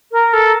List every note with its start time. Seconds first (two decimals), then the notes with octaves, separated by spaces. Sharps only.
0.11 A#4
0.33 A4